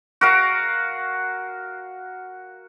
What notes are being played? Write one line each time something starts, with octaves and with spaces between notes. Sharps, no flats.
F#4 A#4 F5